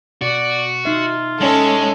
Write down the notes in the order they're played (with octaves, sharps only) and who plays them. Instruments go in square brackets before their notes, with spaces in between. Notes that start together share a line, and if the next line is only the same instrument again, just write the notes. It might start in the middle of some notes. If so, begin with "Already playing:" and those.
[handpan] B2 [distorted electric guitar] F#4 [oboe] D5
[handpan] D#4 E5 [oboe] F4
[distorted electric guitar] G#3 [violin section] C#4 A4